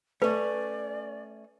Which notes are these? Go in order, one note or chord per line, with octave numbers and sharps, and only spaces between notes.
A3 C#4 B4 D5